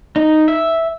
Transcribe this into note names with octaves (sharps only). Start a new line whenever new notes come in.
D#4
E5